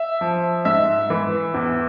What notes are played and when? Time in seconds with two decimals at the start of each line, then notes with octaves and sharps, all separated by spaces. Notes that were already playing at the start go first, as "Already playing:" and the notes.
Already playing: E5
0.21 F3
0.65 G#2 E5
1.10 E3
1.54 E2